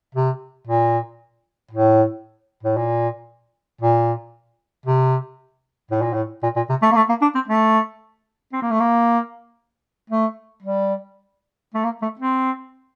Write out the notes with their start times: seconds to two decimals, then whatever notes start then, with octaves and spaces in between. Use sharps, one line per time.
0.15 C3
0.67 A#2
1.71 A2
2.63 A2
2.77 A#2
3.81 A#2
4.86 C3
5.91 A2
6.02 A#2
6.13 A2
6.43 A#2
6.56 A#2
6.69 C3
6.82 A3
6.91 A#3
6.96 A3
7.09 A#3
7.22 D4
7.35 C4
7.48 A3
8.53 C4
8.62 A#3
8.71 A3
8.80 A#3
10.10 A3
10.62 G3
11.74 A3
11.84 A#3
12.02 A3
12.19 C4